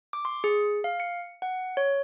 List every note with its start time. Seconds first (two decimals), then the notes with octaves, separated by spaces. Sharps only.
0.13 D6
0.25 C6
0.44 G#4
0.84 F5
1.00 C#7
1.42 F#5
1.77 C#5